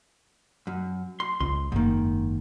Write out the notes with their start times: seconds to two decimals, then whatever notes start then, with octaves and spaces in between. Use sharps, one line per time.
0.67 F#2
1.20 C6
1.40 C#2 C6
1.72 F#1 G#2 D#3 A#3